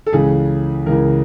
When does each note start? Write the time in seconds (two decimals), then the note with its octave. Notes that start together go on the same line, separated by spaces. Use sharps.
0.06 A4
0.12 C#2 C#3 E3 G#4
0.86 C#2 C#3 E3 A#4